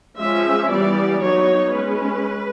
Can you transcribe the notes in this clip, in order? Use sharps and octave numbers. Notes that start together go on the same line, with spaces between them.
F3 G#3 C#4 E5
E3 G3 B3 D5
F#3 B3 D#4 C#5
G#3 C#4 B4